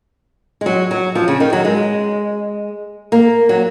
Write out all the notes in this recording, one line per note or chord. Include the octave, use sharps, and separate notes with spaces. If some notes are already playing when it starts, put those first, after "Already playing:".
G#3
F#3
F#3
F3
C#3
D#3
F#3
G#3
A#3
F#3